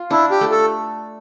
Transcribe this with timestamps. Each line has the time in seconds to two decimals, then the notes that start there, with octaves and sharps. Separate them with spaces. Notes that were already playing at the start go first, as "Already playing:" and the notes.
Already playing: F4
0.10 D4 E4
0.31 G4
0.41 A3
0.51 A4